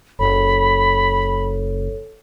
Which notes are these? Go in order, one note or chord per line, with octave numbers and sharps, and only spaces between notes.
F#1 A4 C#5 B5